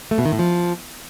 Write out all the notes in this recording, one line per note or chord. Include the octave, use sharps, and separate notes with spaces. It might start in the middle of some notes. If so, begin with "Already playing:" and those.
A3
B2
D#3
A2
F3